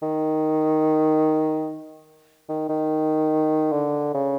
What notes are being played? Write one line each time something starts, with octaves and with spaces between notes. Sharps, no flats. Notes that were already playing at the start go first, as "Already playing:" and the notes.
D#3
D#3
D#3
D3
C#3